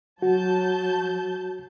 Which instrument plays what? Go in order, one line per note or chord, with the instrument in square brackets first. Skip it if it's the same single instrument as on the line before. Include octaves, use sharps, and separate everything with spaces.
[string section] F#3 A5 G6 [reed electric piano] F#4